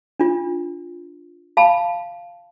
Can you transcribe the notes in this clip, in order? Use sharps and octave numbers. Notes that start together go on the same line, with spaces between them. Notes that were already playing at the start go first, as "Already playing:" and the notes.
D4 F4
F5 A5 B5